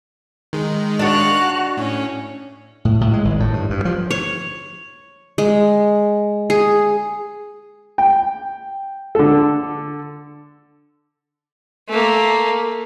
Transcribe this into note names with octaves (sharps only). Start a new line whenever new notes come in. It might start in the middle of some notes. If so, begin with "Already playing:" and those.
D#3 G#3
D4 F#4 C#5 F5 F#6
A2 C#4
A2
A2
G#3
G#1
A2
G2
G2
F3
C#5
G#3
G#4
G5
D3 A4
A3 A#3